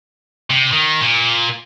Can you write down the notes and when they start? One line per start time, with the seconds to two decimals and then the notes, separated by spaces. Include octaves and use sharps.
0.51 C3
0.73 D#3
1.01 A#2